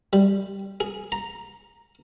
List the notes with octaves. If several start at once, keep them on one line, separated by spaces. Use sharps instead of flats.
G3
G#4
A#5